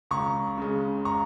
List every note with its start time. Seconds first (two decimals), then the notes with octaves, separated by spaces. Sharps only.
0.11 C#2 A#5 C#6
0.58 C#3 G#3
1.05 A#5 C#6